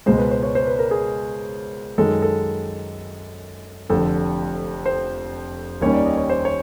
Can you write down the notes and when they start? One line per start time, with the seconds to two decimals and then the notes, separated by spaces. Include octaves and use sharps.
0.06 C#2 B2 G#3 C5
0.18 B4
0.31 C5
0.43 C#5
0.55 C5
0.67 B4
0.79 A#4
0.91 G#4
1.98 F#2 D#3 G#3 A4
2.22 A4
3.90 F1 F2 D3 A4
4.86 C5
5.81 D#2 D#3 G3 A#3 C#4 C#5
5.93 D5
6.06 D#5
6.17 C#5
6.29 C5
6.45 C#5